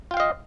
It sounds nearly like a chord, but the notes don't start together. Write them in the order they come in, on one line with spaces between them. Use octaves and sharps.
F4 G5 F5 D#5